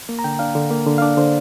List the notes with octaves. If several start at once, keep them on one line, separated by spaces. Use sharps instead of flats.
A#3
A#5
D3 G5
D4 F5
D3
A#3
D3
F5
D4 D5
D3 C5